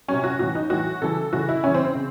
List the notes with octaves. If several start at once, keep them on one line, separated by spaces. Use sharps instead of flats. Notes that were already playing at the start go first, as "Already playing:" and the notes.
C3 F#3 C#4
F#4
A2 E3 F#4
D#4
A2 E3 F#4
C#3 E3 A4
C#3 E3 F#4
E4
C#3 E3 C#4
C4
C4
C#3